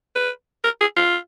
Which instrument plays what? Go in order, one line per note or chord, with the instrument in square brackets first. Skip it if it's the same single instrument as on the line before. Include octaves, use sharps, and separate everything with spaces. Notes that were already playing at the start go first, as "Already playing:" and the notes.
[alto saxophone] B4
A#4
G#4
F4